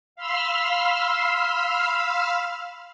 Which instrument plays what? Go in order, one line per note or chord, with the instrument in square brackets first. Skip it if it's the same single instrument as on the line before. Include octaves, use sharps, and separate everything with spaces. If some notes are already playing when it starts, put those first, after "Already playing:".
[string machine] F5 B5 C6 E6 F6